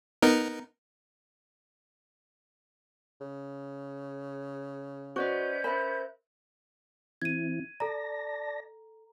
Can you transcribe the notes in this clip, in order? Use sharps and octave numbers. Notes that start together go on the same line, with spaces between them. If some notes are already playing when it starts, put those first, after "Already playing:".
B3 D#4 A#4
C#3
C#4 F#4 B4 C5 D5 D#5 G6
A#4 C5 E5 B5
E3 C4 E4 G#6 D#7
A4 D5 A5 A#5 A#6